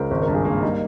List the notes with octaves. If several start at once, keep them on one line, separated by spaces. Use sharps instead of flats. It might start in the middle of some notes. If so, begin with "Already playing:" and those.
Already playing: C#2 A#4 C5
G#1 C5
A#4
G2
G#4
A#3 A#4
G3 D#4